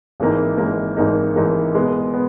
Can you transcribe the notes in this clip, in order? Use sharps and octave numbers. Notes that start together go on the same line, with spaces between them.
G#1 G#2 E3 A#3 D#4
G#1 G#2 E3 A#3 D#4
G#1 G#2 E3 A#3 D#4
G#1 G#2 E3 A#3 D#4
B2 G#3 B3
B3